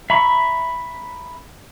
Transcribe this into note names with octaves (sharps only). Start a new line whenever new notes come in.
E5 A#5 B5 C#6